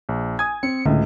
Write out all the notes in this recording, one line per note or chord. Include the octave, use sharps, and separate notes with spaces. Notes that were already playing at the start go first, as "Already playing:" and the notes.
A#1
G#5 D#6 G#6
C4 C#7
C#2 A2 D3